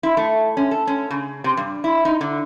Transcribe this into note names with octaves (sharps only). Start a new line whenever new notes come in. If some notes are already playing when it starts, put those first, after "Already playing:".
E4
A3
C#4
A4
C#4
C#3
C3
G2
E4
D#4
D3